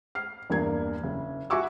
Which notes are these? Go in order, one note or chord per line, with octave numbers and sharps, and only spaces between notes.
F6 C7
E2 G2 A#3 G#6
F#1
F#4 E5 G#5 C#6 D6 E6